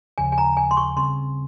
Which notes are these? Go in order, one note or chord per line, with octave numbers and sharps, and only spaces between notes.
D#2 C#3 F3 G#5
G#5
A#5
G#5
C6
C#6
C#3 G3 C4 C6